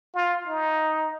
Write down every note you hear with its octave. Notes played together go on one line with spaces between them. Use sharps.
F4
D#4